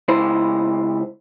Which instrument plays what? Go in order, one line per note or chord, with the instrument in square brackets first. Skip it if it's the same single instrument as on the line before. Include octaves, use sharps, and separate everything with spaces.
[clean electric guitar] C#2 E4 C5